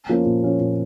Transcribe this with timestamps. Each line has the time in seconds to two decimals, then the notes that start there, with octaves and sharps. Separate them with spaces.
0.09 F3 A#3 C#4 F4
0.26 A#2
0.43 F3 A#3 C#4 F4
0.60 A#2